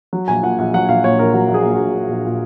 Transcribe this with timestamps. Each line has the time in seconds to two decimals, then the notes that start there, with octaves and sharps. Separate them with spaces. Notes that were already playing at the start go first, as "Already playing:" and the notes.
0.13 F#3
0.28 A#1 G#5
0.43 A#2 F#5
0.59 A#1 F#5
0.74 F#3 F#5
0.88 A#1 F5
1.04 A#2 C#5
1.19 A#1 A#4
1.34 F#3 F#4
1.48 A#1
1.54 G#4
1.64 A#2
1.74 F#4
1.79 A#1
1.94 F#3
2.09 A#1
2.24 A#2